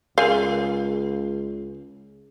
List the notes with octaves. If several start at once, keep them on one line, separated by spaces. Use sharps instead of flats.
C#2 G#4 A#4 F5 G#5